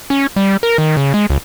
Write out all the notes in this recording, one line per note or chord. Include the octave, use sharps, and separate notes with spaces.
C#4
G3
A#4
D#3
C#3
G#3
C#2